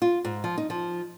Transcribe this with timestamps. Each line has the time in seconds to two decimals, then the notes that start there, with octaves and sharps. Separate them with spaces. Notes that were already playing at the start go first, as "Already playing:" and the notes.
0.02 F4
0.25 G#2
0.44 F3
0.58 D#4
0.70 F3